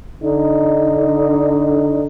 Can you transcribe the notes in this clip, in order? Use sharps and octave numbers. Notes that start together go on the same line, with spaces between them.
D3 D#4